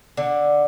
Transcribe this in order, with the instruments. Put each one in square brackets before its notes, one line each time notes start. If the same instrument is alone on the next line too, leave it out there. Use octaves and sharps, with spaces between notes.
[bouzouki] D3